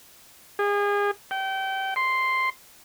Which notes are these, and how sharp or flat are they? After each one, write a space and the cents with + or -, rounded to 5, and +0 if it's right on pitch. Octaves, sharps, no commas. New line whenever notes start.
G#4 -35
G5 -30
C6 +0